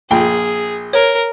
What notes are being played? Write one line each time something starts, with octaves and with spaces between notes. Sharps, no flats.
A#1 G#4 G5
A#4 C#5